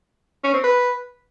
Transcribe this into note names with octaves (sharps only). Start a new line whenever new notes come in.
C#4
C4
B4